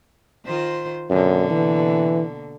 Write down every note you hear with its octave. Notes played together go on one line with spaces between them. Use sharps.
D#3 F4 C5
F#2 B2 D3 A#3
E3